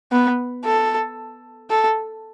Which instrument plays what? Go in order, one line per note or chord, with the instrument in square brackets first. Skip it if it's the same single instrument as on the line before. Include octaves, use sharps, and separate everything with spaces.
[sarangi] B3
A4
A4